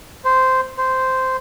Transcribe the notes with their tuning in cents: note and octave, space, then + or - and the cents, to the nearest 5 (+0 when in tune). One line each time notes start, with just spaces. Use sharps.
C5 -10
C5 -10